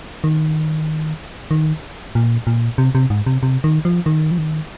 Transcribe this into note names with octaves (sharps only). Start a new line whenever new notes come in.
D#3
D#3
A#2
A#2
C3
C3
G#2
C3
C3
D#3
F3
D#3
F3
D#3